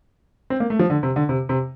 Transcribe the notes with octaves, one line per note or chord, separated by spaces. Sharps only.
C4
A#3
A3
F3
D3
C3
D3
C3
C3